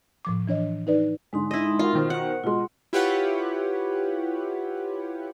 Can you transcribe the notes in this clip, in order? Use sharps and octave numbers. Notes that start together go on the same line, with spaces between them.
A2 F3 D6
E3 D4 C#5 D#5
D#4 B4 D5
G#2 D3 G#3 D#4 C6
E4 D#5
F4 F#4 A#4 E5
B2 D#3 A#4 C5
F#5
B2 G#3 F4 C6
E4 F4 G4 B4 C#5 F#5